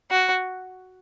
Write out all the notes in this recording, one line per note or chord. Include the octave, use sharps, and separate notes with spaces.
F#4